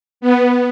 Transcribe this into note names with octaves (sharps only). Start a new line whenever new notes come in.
B3